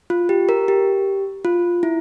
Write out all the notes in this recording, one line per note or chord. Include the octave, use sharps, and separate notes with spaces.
F4
G4
A#4
G4
F4
E4